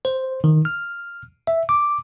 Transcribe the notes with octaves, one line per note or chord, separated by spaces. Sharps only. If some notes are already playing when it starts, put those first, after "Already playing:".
C5
D#3
F6
E5
D6